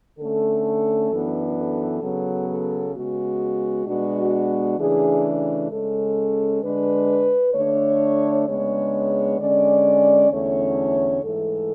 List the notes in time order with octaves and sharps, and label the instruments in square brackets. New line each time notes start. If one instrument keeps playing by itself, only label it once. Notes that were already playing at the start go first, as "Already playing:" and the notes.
[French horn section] D3 A3 C#4 A4
F#2 E3 B3 D4
A4
C#3 F#3 B3
A4
C#3 G#3 B3 F#4
B2 G#3 B3 D4 F#4
C#3 E3 A3 D4 G#4
C#3 G#3 C#4 A4
D3 G#3 D4 B4
D3 A3 D4 C#5
C#3 G#3 B3 D4 C#5
D3 G#3 C#4 D5
E2 D3 A3 C#4 C#5
G#2 E3 A3 A4